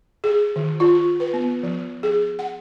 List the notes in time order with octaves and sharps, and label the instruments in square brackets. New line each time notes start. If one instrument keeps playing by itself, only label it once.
[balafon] G#4
D#3
F4
B4
B3
F3
G#4
F#5